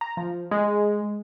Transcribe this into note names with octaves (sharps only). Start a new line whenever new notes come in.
A#5
F3
G#3